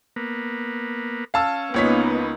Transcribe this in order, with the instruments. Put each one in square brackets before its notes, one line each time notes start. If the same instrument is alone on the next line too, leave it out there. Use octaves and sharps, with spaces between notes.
[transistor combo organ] A#3 B3
[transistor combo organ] C#4 [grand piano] F5 A5 E6
[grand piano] C#2 C#5 B6 [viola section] A#3 B3 D#4